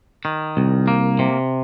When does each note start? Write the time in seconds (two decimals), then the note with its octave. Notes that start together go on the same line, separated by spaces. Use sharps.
0.25 D#3
0.57 C2
0.88 A#3
1.19 C3